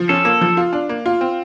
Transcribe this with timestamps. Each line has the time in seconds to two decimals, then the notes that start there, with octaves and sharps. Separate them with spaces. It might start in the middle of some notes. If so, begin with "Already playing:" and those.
Already playing: F3
0.09 C#4 A4
0.25 A#3
0.41 F3
0.57 F4
0.73 D4
0.89 A#3
1.06 F4
1.21 C4